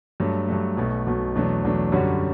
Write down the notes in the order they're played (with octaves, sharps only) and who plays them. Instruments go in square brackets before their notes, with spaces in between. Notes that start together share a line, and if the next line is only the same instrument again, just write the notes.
[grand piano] G2 F#3 A3
G2 F#3 A3
B1 B2 A3
B1 B2 A3
E2 B2 F#3 A3 D4
E2 B2 F#3 A3 D4
F#2 D3 G3 C#4 F#4